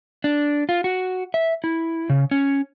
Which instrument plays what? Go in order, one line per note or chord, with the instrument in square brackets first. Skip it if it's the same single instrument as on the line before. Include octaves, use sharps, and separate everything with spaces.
[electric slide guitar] D4
F4
F#4
E5
E4
C#3
C#4